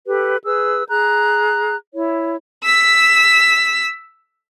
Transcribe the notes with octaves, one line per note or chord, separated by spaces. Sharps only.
G4 A4 B4
G#4 B4 E6
G#4 A#5 F#6 G6
E4 C#5
E6 B6